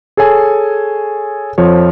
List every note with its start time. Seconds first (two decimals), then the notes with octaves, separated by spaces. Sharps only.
0.17 G#4 A4 C#5 G#5
1.58 F2 F3 C#5